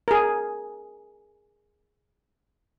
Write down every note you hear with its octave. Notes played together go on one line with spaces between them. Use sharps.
G#4 A#4